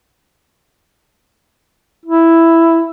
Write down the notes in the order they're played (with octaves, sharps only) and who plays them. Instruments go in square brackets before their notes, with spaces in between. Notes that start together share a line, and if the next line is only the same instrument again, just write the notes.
[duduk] E4